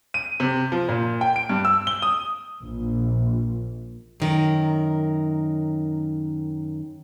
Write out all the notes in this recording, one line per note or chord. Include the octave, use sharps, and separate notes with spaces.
D#7
C3
F3
A#2
G5
D7
G2
E6
G7
D#6
A#1
F#2 D#3 A#4